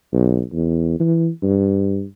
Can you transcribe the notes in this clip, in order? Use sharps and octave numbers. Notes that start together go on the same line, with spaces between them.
B1
E2
E3
G2